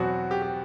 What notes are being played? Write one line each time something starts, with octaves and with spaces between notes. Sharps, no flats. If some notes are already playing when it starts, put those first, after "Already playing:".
Already playing: E2 B2 F#3 C4 F#4
G4
G4